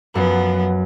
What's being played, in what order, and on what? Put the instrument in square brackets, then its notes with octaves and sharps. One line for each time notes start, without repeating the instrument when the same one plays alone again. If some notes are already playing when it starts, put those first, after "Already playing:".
[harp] F#2 [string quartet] F3 B3